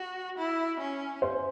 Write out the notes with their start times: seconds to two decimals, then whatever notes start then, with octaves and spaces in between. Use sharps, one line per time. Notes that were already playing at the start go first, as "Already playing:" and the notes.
Already playing: F#4
0.38 E4
0.80 C#4
1.22 C5